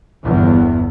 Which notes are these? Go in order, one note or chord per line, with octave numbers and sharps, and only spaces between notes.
G1 E2 G2